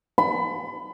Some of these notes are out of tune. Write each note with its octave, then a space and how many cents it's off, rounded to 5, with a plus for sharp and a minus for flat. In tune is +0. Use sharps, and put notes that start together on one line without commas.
B5 +30